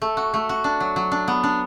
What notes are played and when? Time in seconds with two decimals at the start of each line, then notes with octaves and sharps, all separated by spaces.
0.02 A3
0.17 F#4
0.34 A3
0.49 F#4
0.64 D4
0.80 F#3
0.96 F#3
1.12 D4
1.28 B3
1.44 D4